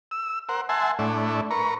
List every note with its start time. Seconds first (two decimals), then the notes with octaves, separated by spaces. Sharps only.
0.11 E6
0.49 A#4 C5 F#5
0.69 E5 F#5 G#5 A5 C6
0.99 A2 A3 D4 E4
1.51 A#4 B4 A#5 C#6